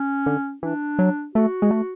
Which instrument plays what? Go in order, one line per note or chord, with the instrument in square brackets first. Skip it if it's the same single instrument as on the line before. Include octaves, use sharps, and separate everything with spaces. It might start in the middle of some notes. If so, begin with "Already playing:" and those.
Already playing: [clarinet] C#4
[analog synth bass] D3
[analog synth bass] E3 [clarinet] D4
[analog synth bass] F#3
[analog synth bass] A3 [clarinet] F#4
[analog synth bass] G#3
A3